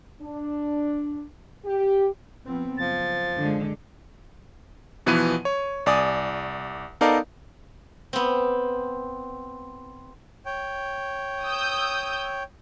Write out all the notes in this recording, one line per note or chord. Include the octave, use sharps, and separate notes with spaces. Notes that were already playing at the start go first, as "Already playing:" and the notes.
D4
G4
F3 B3 C4
F#1 F3 A6
D3 G#3
B2 E3 F3 B3 B4 D#7
C#5
C2 D5 G#5 D#6
B3 D#4 A4 A#4 D5 F5
B3 C4
C#5 G5
D#6 E6 G6